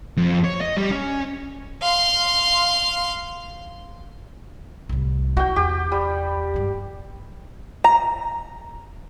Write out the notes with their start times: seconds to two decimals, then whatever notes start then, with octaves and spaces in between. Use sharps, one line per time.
0.17 F2
0.44 C#5
0.61 D#5
0.77 G3
0.91 C#4
1.82 F5 C6
4.89 C2 A2
5.37 E4 F#4 G5
5.56 E2 G4
5.92 G3
6.54 G2 G#3
7.84 A#5